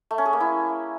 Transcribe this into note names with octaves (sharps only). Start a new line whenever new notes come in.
A3
C#4
G#4
A#3
E4